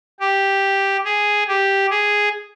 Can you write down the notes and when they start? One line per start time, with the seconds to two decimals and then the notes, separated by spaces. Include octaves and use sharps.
0.20 G4
1.05 G#4
1.48 G4
1.91 G#4